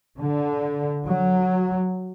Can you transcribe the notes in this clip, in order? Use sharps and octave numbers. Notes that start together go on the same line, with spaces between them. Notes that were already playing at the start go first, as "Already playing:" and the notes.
D3
F#3